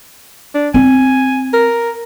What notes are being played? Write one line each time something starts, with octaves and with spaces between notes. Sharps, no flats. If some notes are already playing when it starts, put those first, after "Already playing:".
D4
C4 G#5
A#4